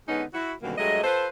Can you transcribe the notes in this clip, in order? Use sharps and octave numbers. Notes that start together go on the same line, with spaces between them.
D3 G#3 B3 C#4 D#4
E4 F#4
F#2 B2 D3 D#3 G3 A#3
G2 F#3 G#3 A3 D#5
F4 A4 B4 C5